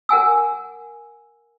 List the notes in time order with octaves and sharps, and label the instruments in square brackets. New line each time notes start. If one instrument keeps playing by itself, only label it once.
[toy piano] A#4 F#5 G#5 E6